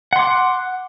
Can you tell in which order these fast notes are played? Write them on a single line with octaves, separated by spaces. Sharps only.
F#5 C6 D6